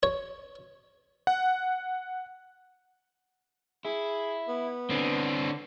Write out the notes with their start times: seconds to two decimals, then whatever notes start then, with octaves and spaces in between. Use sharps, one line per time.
0.03 C#5
1.27 F#5
3.85 E4 G#4
4.48 B3
4.90 D3 C4 D4